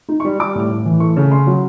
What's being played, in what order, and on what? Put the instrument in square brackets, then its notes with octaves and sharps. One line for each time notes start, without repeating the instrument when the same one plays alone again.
[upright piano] D#4
C#6
G3
G3 D6
A2
A2
E3
A3 C#6
C#3
C#4 C6
F#3